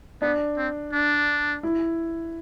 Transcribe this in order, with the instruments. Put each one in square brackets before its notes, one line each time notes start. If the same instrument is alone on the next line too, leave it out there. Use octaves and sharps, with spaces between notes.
[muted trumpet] B3 [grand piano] D4
[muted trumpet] C4
D4
[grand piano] E4